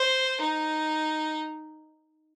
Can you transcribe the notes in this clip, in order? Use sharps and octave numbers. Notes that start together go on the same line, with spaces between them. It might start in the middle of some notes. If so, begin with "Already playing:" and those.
Already playing: C5
D#4